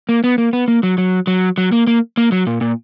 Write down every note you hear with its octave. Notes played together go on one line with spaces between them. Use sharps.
A#3
B3
A#3
B3
A#3
F#3
F#3
F#3
F#3
A#3
A#3
A#3
F#3
A#2
A#2